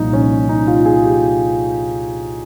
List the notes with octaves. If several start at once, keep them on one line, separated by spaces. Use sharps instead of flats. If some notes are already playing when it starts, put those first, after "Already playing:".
Already playing: C2 A#2 F3 D#4
C#4
D#4
F4
G#4
G4